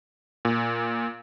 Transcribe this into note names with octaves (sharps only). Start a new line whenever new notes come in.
A#2